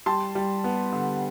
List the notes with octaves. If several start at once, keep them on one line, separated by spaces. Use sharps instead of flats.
G3 A5 C6
G3
B3
D3